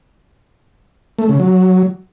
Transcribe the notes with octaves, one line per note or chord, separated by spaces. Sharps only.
A3
C#3
F#3